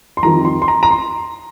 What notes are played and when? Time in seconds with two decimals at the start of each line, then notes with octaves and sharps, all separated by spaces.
0.17 C6
0.23 F2 D#3 G3 A#5
0.45 C6
0.62 C6
0.68 A#5
0.83 A#5
0.91 C6